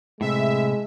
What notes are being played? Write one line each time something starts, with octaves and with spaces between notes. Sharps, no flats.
A2 C3 G#3 E5